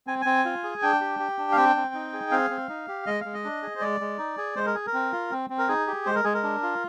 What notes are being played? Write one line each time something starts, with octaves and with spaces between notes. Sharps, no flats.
C4 G#5
C4 G#5
F4
G#4
D4 G5
G4
G4
D4
F5
C4 G5
C4
D#4
G#4
C4 F5
C4
D#4
G4
G#3 D#5
G#3 F5
D#5
D4
G#4
C5
G#3 D5
G#3
D#4
G#4
G#3 C5
A#4
G#4
A#4
C4
F4
C4
C4
A#4
D#4 G#4
G4
G#3 C5
A#4
G#3 G#4
A#4
D4
F4